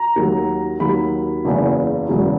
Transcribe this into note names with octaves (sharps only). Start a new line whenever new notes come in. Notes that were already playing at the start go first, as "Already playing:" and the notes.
Already playing: A#5
D#2 D#3 F#3
D#2 D#3 F#3 B5
F#1 E2 C#3
E1 E2 C#3 F#3